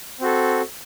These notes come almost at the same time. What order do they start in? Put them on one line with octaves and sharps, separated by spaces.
C4 F#4 A4